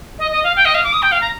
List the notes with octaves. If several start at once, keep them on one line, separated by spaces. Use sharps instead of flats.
D#5
D#5
F5
G5
D#5
F5
D6
D#6
G5
F5
A#5